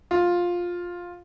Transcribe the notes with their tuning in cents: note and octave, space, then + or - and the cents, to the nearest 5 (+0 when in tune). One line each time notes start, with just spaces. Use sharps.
F4 +10